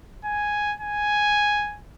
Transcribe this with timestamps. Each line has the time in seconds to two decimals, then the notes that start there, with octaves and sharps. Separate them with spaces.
0.25 G#5
0.81 G#5